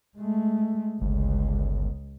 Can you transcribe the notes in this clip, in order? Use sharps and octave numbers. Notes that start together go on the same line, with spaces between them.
G#3 A3
G1 C#2 G#3